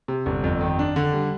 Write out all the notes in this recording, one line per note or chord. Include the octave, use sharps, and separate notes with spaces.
C3
G1
F2
D#3
D4
D3
G3